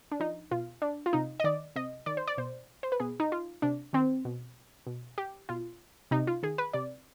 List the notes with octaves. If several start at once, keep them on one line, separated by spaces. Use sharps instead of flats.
D4
F3 D#4
B2 F4
D4
F4
C3 D#4
D#5
D#3 D5
C3 D#5
D#3 D5
C5
D5
B2 C5
C5
B4
B2 G#4
D#4
F4
C3 D4
D#3 C4
B2
B2
G4
B2 F4
C3 D#4
F4
D#3 G#4
B4
C3 D5